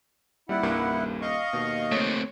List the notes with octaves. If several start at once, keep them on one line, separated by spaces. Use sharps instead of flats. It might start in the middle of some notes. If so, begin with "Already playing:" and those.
D#1 G3 E4 D5 F#5
C2 G2 A#3
D#5 F5 C#6
D#2 B2
A3 C4 C#5